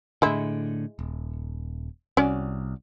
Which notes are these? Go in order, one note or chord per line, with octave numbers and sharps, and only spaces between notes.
A2 D3 G#3 E4
D#1
C2 C#4 F#4 D5